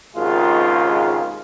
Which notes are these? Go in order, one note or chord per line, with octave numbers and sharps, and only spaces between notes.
G#1 D#2 C#3 G#3 F4